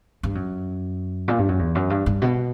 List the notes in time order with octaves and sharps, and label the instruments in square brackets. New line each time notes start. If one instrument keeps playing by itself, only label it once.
[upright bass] G2
F#2
A#2
G2
F#2
E2
F#2
G2
G2
B2